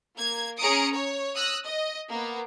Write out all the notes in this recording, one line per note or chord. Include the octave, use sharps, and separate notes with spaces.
A#3 G#6
C#4 G#4 A#5 D#6 C#7 D7
C#5
D#6 E6 F#6 A#6
D#5
A#3 B3